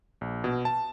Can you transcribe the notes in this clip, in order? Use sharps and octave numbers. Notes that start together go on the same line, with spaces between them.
A#1
B2
A5